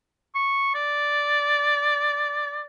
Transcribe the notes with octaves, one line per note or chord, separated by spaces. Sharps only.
C#6
D5